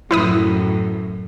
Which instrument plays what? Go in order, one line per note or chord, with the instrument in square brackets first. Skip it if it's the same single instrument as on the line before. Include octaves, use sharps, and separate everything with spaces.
[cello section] F#2 A2 [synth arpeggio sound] E4 B4 D#6